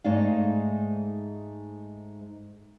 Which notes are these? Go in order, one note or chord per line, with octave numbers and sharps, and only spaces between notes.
G#2 G#3 A3 D#4 D5 F5